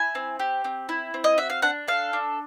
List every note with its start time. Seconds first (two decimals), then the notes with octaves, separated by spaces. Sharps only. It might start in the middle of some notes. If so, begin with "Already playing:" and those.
Already playing: E4 G#5
0.15 C4
0.39 G4
0.65 C4
0.89 E4
1.14 C4
1.24 D#5
1.38 F#4 E5
1.50 F5
1.62 D4 F#5
1.88 A4 F5
2.13 D4